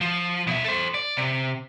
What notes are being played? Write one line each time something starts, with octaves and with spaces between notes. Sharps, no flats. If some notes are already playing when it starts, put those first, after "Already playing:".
F3
B2 E5
A4 C5
D5
C3